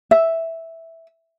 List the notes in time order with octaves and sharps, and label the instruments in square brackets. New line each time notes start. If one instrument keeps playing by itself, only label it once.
[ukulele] E5